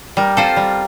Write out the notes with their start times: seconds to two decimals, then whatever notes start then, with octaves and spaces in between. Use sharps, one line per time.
0.17 G3 G4 A#4
0.37 C4 F4 A4 C5
0.56 G3